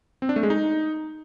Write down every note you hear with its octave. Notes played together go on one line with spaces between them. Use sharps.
C4
D4
A3
G#3
D#4